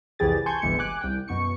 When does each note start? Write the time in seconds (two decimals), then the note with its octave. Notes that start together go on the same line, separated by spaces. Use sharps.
0.19 C2 F2 E3 G4 G#4 A6
0.46 G#5 A5 C6 C#6 G6 G#6
0.62 G1 C2 E3 G#3 C#7
0.79 G#5 D6 F#6
1.01 C2 G5
1.28 F#2 B2 C#6 C#7